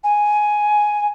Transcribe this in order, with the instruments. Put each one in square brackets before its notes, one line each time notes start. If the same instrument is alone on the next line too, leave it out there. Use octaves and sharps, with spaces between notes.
[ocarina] G#5